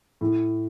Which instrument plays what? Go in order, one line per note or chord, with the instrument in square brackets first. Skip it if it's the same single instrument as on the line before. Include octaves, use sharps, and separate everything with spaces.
[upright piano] A2